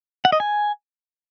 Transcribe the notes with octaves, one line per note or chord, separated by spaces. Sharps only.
F#5
D#5
G#5